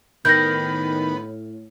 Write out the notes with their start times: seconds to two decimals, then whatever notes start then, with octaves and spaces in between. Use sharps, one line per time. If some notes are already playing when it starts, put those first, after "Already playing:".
0.25 A2 D#3 B3 G6 A#6